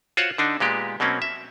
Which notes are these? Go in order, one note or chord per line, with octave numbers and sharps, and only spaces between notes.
F4 F#4 C5 C#5 F#5
D3 D4 D#4
A#2 G#3 B3 G4
B2 F#3 A#3 C4 C#4
E5